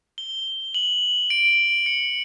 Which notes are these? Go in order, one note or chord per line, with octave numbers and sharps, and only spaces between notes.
G7
F#7
D7
C#7